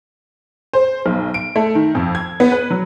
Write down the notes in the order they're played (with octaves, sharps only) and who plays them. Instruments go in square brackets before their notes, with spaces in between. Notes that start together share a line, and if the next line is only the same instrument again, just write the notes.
[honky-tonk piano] C5
B1
D7
A3
D#3
F2
G#6
B3
B4
F#3